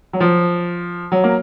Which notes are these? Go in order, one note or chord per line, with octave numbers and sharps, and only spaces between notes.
F#3
F3
F#3
A#3